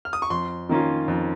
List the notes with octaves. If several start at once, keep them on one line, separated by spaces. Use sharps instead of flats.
F6
D#6
C#6
F2 C6
D#3 A#3 C#4 F4
F2